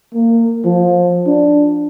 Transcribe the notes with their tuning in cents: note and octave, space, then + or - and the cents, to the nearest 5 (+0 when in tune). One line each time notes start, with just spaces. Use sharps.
A#3 -25
F3 +20
D4 +0